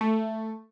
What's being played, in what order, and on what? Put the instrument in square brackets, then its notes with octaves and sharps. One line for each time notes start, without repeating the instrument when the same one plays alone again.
[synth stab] A3